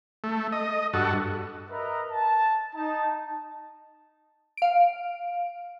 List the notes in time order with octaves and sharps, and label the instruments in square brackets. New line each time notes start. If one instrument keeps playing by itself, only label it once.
[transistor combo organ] A3
D#5
G2 F#4 A4
[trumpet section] A#4 B4 D#5 E5 A#5
A5
D#4 A5
[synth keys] F5 D7